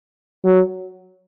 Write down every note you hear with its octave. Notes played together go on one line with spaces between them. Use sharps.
F#3